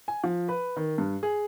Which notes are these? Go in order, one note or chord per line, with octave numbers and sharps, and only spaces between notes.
G#5
F3
B4
D#3
G2
G#4